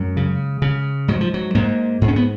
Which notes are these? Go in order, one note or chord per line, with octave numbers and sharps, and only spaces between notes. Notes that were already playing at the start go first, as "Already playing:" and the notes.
Already playing: F#2 G#3
C#3
C#3
G#2 F#3
F3
F#3
G#2 A#3
G#2
C#4
B3